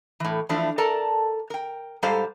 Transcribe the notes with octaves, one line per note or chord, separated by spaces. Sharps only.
A2 E3
E3 F3 A3 D4 E4
A4 A#4 D5 A5
A#4 G5
G#2 G3 G4 A4 C5 F5